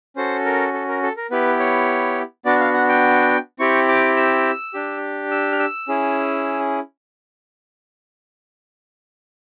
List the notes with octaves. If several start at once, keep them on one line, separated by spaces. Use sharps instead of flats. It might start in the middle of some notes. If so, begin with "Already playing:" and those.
C#4 F#4 A4 C5
A#4
A4
A#4
A4
A#4
B3 E4 G4 B4
C#5
B3 D4 F#4 D5
F5
F#5
G5
C4 E4 G4 C#6
D6
E6
D4 G4
E6
F6
E6
C#4 E4 G#4